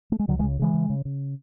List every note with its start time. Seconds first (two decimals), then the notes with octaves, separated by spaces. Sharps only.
0.12 A3
0.19 G#3
0.28 C#2 D3 F#3
0.39 E3 G#3
0.43 C#3
0.59 C#3 E3 G#3
0.74 C#3
0.90 C#3
1.05 C#3